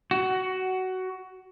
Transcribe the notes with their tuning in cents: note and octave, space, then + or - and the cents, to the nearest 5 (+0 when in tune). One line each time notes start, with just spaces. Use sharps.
F#4 +15